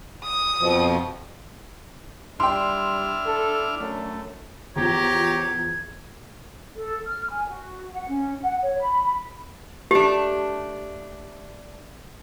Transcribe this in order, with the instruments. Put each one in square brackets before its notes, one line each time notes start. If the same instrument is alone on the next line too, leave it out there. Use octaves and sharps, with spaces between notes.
[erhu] D#6
[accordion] F2 B2 F3
[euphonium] G3 [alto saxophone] D4 [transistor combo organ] E4 D6 F6 [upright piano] G5 C6
[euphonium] A4
[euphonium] F#2 [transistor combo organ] A3
[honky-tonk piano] E2 F3 [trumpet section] G4 C#5 A#5 [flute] G#6
[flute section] A4
F6
G#5
F#4
F#5
C#4
F#5
C#5
B5
B5
[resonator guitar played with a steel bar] A3 D4 [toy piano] G4